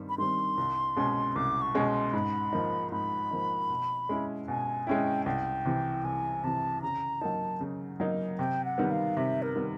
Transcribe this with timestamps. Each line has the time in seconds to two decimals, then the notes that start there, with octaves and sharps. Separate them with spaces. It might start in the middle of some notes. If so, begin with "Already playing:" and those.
Already playing: G2 D#3 G3 C4
0.09 B5
0.18 D#3 G3 C4 C6
0.58 C2
0.96 B2 G#3 C#4
1.36 C2 D6
1.62 C#6
1.74 B2 G#3 C#4
1.88 C6
2.13 G#2 B5
2.53 F3 A#3 D#4
2.92 G#2 B5
3.31 F3 A#3 D#4
3.70 B2
4.09 G#3 C#4 E4
4.48 B2 G#5
4.87 G#3 C#4 E4 G5
5.26 C2 G5
5.65 C3 E3
6.04 C2 G#5
6.43 C3 E3 A5
6.82 C#3 A#5
7.21 F#3 A#3 D#4 A5
7.60 C#3
8.00 F#3 A#3 D#4
8.39 C3 G5
8.65 F#5
8.78 D#3 G3 B3
8.91 F5
9.17 C3 E5
9.42 A#4
9.56 D#3 G3 B3